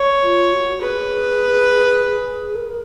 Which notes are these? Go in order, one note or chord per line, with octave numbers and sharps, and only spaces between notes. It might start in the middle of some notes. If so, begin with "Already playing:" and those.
Already playing: C#5
F4
F#4
G#4 B4
A#4